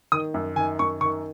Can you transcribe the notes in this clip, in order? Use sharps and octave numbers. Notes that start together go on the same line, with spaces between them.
D#3 D#6
F#2
D#3 G#5
F#2 C#6
D#3 C#6